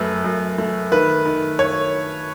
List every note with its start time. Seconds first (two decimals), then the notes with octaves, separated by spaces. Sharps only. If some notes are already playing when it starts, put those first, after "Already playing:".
Already playing: F#2 A3 B4
0.24 F#2
0.58 A3
0.92 D#3 B4
1.26 D#3
1.59 C#5